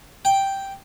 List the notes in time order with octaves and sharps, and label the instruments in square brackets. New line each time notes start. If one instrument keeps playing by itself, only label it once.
[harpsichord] G5